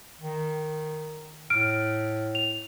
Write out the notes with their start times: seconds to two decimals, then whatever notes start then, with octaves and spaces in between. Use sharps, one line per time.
0.20 D#3
1.50 A2 F6 D7
2.35 F7